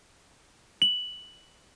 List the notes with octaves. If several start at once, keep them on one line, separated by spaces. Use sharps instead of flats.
F#7